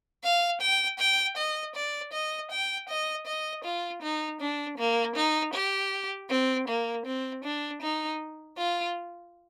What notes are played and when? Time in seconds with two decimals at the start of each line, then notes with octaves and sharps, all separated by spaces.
0.24 F5
0.61 G5
0.99 G5
1.37 D#5
1.75 D5
2.13 D#5
2.51 G5
2.89 D#5
3.27 D#5
3.64 F4
4.02 D#4
4.41 D4
4.78 A#3
5.16 D#4
5.54 G4
6.30 C4
6.68 A#3
7.06 C4
7.44 D4
7.82 D#4
8.58 F4